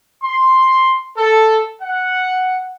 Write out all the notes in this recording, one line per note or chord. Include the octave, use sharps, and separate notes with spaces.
C6
A4
F#5